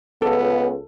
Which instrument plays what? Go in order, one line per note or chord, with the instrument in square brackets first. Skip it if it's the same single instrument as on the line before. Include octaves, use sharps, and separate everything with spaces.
[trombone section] C#2 [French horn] B3 [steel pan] A4